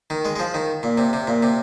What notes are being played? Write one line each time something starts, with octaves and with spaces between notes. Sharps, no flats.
D#3
G#3
G#3
F3
D#3
A#2
C3
C3
A#2
C3